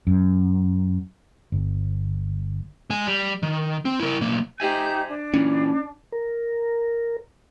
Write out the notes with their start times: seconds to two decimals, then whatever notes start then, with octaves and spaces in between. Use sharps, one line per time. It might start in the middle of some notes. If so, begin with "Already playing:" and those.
0.07 F#2
1.52 G1
2.90 G#3 G#5
3.06 G3
3.43 D#3
3.85 C4
4.00 E4 A#4
4.21 B1 A#3
4.60 D#4 G4 C5 E5 G#5 G6
5.09 D4
5.34 A#2 E3 C#4
6.12 A#4